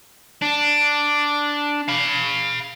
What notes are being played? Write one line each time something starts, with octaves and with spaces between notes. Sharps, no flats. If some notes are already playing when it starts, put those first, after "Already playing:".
D4
F5 B5